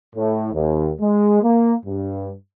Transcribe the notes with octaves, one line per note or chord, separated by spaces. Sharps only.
A2
D#2
G#3
A#3
G2